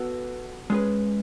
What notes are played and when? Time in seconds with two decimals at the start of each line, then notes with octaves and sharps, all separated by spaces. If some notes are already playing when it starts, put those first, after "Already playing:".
Already playing: B3 F#4 A4
0.70 G#3 C#4 G#4 B4